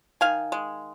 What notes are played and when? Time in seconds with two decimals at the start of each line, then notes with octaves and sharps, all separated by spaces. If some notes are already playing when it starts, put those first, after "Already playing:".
0.21 D#3 F5 G#5
0.52 G#3